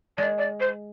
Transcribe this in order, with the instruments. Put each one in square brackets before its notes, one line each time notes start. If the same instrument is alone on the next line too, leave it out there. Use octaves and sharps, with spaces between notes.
[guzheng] G#3 [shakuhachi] D5
[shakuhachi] D5
C5